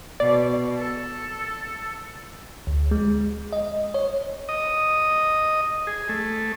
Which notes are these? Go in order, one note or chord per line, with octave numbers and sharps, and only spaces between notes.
B2 D5
A4
D2
G#3
D#5
C#5
D#5
G#4
A3